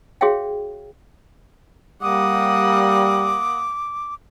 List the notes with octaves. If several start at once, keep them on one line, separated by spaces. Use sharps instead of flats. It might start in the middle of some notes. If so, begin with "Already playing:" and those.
F#4 G#4 C#5 E5 F5 G5
G3 A#3 F#5 D6 D#6